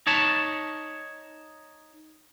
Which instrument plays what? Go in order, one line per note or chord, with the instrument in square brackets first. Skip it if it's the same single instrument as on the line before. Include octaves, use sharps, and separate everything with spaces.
[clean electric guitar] D#4 C#5 A5